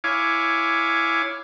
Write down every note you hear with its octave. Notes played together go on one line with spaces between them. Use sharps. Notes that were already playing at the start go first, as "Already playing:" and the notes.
E4 C#5 F5 G#5 D6